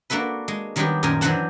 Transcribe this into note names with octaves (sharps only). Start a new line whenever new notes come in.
A#3 D4 F#4 A4 B4
G#3
D#3 F#3 G3 B3 D4 G4
F#2 A#2 D#3 A#4 G#5 A#5
E3 F#3 D4 C5 F#5 A5